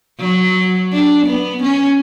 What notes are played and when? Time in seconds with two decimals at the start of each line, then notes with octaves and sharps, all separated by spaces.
0.20 F#3
0.92 D4
1.26 B3
1.63 C#4